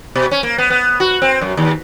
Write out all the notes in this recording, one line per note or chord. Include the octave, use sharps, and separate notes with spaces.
B2
C#4
A#3
B3
B3
F#4
C4
F#2
D#2